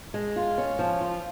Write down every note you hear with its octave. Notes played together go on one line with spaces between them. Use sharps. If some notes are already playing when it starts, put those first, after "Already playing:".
G#3
F4
C#4
F3
F4